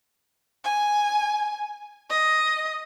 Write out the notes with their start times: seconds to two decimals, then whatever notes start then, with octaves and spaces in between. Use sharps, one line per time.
0.64 G#5
2.10 D#5